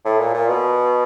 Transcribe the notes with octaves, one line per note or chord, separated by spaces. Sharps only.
A2
A#2
A#2
B2